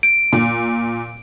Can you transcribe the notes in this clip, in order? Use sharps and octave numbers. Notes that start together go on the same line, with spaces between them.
D7
A#2